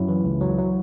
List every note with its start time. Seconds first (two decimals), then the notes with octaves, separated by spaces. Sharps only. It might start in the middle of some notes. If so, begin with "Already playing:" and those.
Already playing: F#2 F#3 E4
0.08 E3
0.25 C#2
0.41 F#3
0.59 F#3